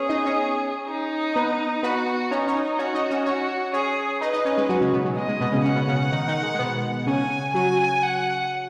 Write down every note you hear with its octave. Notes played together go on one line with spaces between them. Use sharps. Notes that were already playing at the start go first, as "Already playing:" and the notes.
Already playing: B3 C#4 G#4 B4 C#5
D#4 D#5
C#4 C#5
D#4
B3 B4
B3 F#4 B4
C#4 D#4 C#5
C#4 C#5
C#4 F#4 C#5
D#4 D#5
C#4 C#5
C#4 F#4 C#5
C#4 G#4 C#5
D#4 B4 D#5
D#4 D#5
C#4 C#5
G#3 G#4
F#3 F#4
C#3 C#4
B2 B3
F#3
G#3 D#5
G#3
B2 B3
C#3 C#4
C#3 C#4 F#5
B2 B3
C#3 C#4
D#3 D#4
D#3 D#4
G#3
G#3
B2 B3
C#3 C#4 G#5
F#3 F#4 G#5
F#5